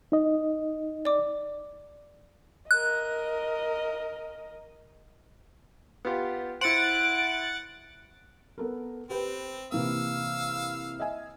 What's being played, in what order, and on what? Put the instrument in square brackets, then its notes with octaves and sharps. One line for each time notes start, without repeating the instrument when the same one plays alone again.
[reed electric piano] D#4 D#5
[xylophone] D5 D6
[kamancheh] A#4 D#5 [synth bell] F#6
[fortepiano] B3 F4 G4
[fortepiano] E4 C5 [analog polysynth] F#5 A6 [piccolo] D7
[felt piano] B3 A4 A#4
[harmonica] C4 [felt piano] G4 B4 G5
[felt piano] C3 E3 A#3 [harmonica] F5 E6
[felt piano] D#5 E5 G#5